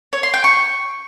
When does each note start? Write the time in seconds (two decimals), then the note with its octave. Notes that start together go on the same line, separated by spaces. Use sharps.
0.13 C#5
0.23 C6
0.34 G5
0.44 C#6